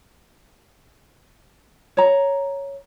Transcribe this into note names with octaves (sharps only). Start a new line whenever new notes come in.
C#5 A#5